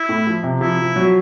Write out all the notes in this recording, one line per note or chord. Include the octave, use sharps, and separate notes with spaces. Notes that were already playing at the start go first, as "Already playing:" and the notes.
Already playing: E4
A2
F3
C3
F3 E4
F3
F#3